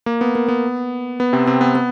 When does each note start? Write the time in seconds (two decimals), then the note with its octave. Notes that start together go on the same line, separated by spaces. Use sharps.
0.06 A#3
0.21 B3
0.35 A#3
0.48 B3
1.20 B3
1.33 C3 C4
1.47 C3 C4
1.61 B3
1.75 B3